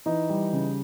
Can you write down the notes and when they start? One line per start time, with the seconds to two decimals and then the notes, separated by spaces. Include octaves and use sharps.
0.06 E3 D#4
0.30 G3
0.53 C#3